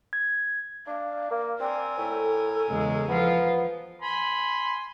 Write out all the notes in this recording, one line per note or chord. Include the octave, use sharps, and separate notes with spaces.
G#6
D4 F5
A#3
C4 A#4 D5 G#5
A2 A4
E2 C#3 G#3
F3 B3 F4
G#5 B5 C6